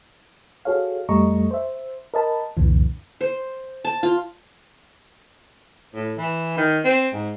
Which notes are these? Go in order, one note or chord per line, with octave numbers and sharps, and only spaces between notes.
F#4 G#4 A4 C#5 F5
F2 G3 A3 D#5 A#5 C#6
C5 E5
A#4 D#5 A5 B5
C2 F2 A#2 D3 E3
C5
A5
F4
A2
E3
D#3
C4
G#2